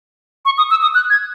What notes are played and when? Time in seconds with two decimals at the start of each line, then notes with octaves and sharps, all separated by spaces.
0.45 C#6
0.58 D#6
0.70 E6
0.82 D#6
0.95 F#6
1.10 G#6